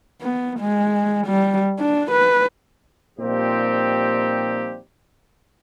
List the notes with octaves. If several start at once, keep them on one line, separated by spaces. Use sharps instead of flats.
B3
G#3
G3
D4
B4
A#2 F3 G3 C4 D#4 G4